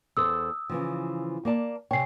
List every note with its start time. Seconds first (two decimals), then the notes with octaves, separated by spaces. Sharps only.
0.17 E2 A4 C5 D#6 E6
0.69 C#3 E3 F3
1.45 A#3 D5 A5
1.91 C3 C#5 G5 G#5 C7